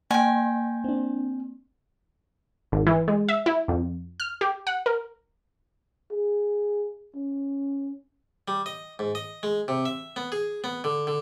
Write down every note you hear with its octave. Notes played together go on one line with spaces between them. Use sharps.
A#3 G5 G#5
C4 D4
G#1
E3
G#3
E5
E4
F2
F6
G4
F#5
A#4
G#4
C#4
G3
D#5
G#2
D#5
G#3
C3
E5
B3
G#4
B3
D3
D3